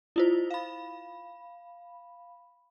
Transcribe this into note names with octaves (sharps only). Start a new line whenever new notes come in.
E4 F4 C5
F5 B5